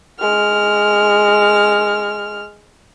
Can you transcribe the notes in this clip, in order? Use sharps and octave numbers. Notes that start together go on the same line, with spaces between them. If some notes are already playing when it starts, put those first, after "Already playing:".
G#3 F6